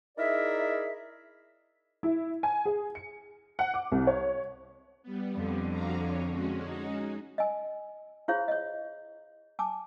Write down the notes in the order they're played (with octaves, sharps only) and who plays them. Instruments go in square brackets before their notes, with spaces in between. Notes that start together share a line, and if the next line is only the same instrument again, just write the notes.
[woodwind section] D#4 E4 G#4 A#4 D5 E5
[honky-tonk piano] E4
G#5
G#4
C#7
F#5
D6
C2
C#5
[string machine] G3 B3
[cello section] F2 D3 C4
[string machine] F#4 F5 A#5
C#5
G#3 C#4 F#4
[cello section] D#4
[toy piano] D#5 G#5
E4 F4 G#4 C5 C#5 F5
C#5 D#5
G#5 A5 D6